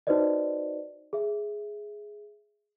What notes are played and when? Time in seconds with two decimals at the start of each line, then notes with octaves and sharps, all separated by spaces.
0.07 D#4 F#4 B4 C5 D5 D#5
1.13 G#4 E5